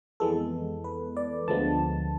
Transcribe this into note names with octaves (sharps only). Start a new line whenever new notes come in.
F2 E3 G#3 B3 A4
B4
D5
D2 D3 F3 G#3 B3 A5